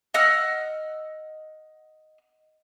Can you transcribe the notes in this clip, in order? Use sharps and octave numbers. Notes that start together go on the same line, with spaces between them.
D#5 F#5 E6 F6